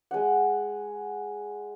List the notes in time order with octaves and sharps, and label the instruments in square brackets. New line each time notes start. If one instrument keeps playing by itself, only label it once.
[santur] G#3 F#5